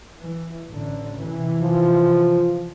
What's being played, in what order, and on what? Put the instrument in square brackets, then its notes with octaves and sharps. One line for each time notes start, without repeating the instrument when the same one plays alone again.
[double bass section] E3
A1 D3
C3 E3
[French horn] F3